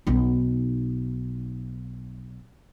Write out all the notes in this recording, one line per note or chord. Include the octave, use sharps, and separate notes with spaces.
B1 D#4